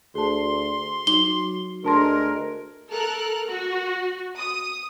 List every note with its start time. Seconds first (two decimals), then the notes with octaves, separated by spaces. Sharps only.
0.15 D2 G#4 A5 C6
1.07 F#3 D#4 G7
1.84 D2 G#3 D4 A#4 A5 C6
2.91 A4 A#4 F6 F#6
3.48 F#4
4.37 D#6